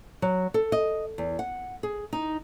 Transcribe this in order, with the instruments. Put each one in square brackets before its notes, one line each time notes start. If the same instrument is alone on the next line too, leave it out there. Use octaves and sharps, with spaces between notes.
[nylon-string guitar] F#3
A4
D#5
E2
F#5
G#4
D#4